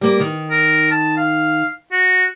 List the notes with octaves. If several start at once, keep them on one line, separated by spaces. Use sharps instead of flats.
G3 A#3
D#3
A#4
A5
F5
F#4